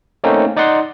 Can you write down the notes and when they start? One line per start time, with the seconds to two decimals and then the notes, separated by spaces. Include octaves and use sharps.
0.24 A3 A#3 C4 C#4 D#4
0.56 D#4 D5 D#5 F#5 C6